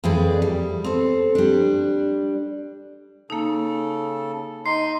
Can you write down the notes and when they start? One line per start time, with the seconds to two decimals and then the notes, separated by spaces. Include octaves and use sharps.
0.04 F2 E3 G#4 B4 D5
0.42 G3
0.84 C4 A4
1.35 G3 D4
3.30 C#3 A#3 D#4 A4
4.66 D#4 C6 C7